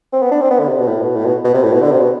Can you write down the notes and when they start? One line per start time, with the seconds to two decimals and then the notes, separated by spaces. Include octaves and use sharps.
0.13 C4
0.22 B3
0.31 D4
0.41 C4
0.50 B3
0.59 D3
0.69 C3
0.78 B2
0.88 A2
1.02 B2
1.16 A2
1.26 B2
1.44 B2
1.54 C3
1.63 A2
1.73 B2
1.82 D3
1.92 C3
2.01 B2